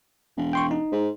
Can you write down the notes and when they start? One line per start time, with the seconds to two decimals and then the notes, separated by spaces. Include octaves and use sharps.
0.37 E1
0.53 G5 C6 C#6
0.71 D#4
0.92 G#2